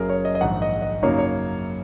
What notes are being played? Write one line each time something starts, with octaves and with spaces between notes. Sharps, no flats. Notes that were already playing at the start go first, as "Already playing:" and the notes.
Already playing: F#1 F#2 F#3 G#4 A#4
C#5
D#5
D#5
A#1 G#2 D#3 F#5
D#5
D#5
F#2 C#3 F#3 A#3 D#4 C#5
C#5